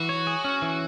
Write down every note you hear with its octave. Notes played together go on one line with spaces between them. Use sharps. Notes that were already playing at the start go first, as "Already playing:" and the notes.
Already playing: E3 F#4
C#5
G#4
C#4
E3